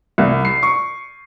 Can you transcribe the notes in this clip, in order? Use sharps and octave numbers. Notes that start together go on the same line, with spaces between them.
C2
C7
C#6